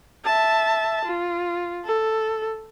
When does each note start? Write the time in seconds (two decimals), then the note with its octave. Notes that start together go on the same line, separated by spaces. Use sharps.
0.25 E5 A5
1.05 F4
1.85 A4